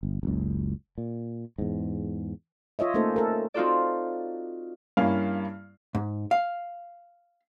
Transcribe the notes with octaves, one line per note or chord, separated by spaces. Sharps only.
G1
F#1 C#2
A#2
E2 G#2
F4 C#5 D#5 E5
A3 A#3 C#4 D#4 A4 C5
A4 A#4
C4 D#4 F4 F#4 A4 D5
G2 A#3 C#4 E4 F5 F6
G#2
F5